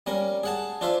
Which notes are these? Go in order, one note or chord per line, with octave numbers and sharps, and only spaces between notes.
G3 C#4 A#4
G#4 F#5 A5
D4 F4 C5 E5